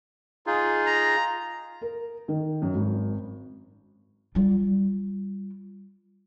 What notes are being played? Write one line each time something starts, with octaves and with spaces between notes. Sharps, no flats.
D#4 F4 G#4
A#5
A#4
D#3
F#2
G#1
G3 F4